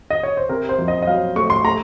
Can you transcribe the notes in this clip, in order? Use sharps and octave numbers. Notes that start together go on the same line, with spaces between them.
D#5
C#5
C5
C3 A#4
C5
F2
D#5
D#5
F#3 F5
A3 C#6
C6
A3 A#5